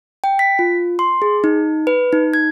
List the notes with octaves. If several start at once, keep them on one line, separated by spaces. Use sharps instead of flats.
G5
B6
F4
C6
G#4
D#4
B4
D#4
G#6